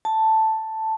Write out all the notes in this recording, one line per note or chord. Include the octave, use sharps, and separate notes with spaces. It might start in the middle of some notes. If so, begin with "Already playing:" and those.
A5